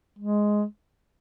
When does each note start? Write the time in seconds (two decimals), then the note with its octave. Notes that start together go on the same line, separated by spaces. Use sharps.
0.19 G#3